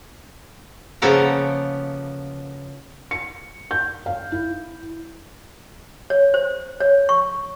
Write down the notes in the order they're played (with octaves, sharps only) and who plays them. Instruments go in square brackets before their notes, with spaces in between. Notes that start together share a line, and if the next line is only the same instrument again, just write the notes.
[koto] C#3 F3 A#3 B3 A4 A#4
[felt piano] C#7
G6
F5
E4
[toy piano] C#5
C5
C#5
C#6